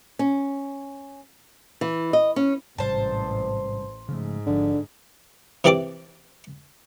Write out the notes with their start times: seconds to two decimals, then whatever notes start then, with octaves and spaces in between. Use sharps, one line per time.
0.19 C#4
1.81 E3
2.13 D#5
2.36 C#4
2.78 A1 G#2 C3 G3 C5 A5
4.09 G#2 C#3 F3 A3
4.46 G#1 D3 F3
5.64 C3 E3 G4 D5 A5 D6